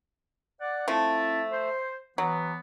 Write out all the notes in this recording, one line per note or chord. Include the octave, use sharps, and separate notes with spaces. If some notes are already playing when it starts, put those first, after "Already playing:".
D5 F#5
F3 A3 C4 E4 A5
C5
E3 F#3 B3